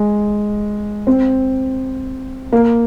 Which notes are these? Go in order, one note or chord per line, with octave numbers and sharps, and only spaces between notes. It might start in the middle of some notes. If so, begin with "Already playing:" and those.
Already playing: G#3
C4
A#3